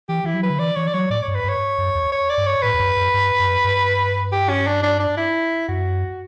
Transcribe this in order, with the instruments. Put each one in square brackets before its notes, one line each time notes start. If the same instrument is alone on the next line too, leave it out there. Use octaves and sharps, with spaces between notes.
[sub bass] E3 [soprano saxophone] G4
[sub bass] E3 [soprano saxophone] E4
[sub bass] F#3
[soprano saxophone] B4
[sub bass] D3
[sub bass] E3 [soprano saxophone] D5
[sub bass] E3 [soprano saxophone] C#5
[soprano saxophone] D5
[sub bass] F#3 [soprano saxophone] C#5
[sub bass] A2 [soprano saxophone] D5
[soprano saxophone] C#5
[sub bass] G2
[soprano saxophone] B4
[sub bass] G2
[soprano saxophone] C#5
[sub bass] F#2
E2
[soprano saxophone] C#5
D5
[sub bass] G2
[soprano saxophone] C#5
[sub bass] A2 [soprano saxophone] B4
[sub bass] E2
F#2
F#2
G2
F#2
G2
[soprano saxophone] G4
C#4
D4
D4
D4
E4
[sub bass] F#2 [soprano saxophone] F#4